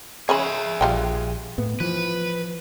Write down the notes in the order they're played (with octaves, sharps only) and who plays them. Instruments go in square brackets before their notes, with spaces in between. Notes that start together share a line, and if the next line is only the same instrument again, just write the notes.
[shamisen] C#3 C#4 B5 [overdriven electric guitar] G#4 E5
[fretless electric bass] A#1 [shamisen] G3 F4 G5
[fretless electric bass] A2 B3
[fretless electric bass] E3 F3 [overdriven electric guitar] B4